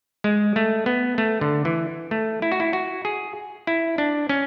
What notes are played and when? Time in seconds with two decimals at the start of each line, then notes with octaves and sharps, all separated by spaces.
0.24 G#3
0.56 A3
0.86 B3
1.18 A3
1.41 D3
1.65 E3
2.11 A3
2.42 E4
2.52 F#4
2.60 E4
2.73 F#4
3.05 G#4
3.67 E4
3.98 D4
4.29 C#4